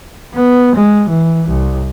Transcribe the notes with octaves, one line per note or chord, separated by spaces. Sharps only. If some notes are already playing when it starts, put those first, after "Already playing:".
B3
G#3
E3
C2